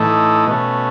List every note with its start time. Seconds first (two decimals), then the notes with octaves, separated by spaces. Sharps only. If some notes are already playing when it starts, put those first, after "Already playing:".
Already playing: A2 E3 A3 D#4
0.46 B2 A3 C#4